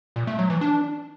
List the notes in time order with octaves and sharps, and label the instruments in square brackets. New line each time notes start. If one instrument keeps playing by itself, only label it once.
[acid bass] A#2
A3
F#3
E3
D4